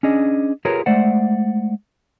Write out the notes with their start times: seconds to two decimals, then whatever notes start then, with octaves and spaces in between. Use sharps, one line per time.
0.03 C#4 D4 G#4 D#5
0.65 F4 G4 G#4 A#4 B4 C#5
0.86 G#3 A3 C5 D5 F#5